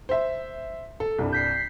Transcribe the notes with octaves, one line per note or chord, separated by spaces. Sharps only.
C5 E5
A4
C2 G2
G6 B6 C7